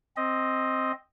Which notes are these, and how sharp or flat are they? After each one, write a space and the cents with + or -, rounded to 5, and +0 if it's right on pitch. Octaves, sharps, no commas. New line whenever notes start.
C4 +5 D#5 +5